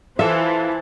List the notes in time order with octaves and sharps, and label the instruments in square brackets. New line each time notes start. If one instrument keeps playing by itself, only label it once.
[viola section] E3 [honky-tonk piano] F4 A4 [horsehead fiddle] C5 A5 [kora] E5